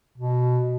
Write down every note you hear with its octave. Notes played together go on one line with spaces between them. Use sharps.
B2